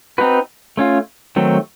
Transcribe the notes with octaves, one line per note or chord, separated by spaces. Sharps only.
C4 D#4 F#4 B4
A3 C#4 F4
D#3 F#3 A3 C4